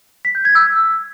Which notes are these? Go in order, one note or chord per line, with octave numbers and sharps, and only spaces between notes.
B6
G6
G#6
E6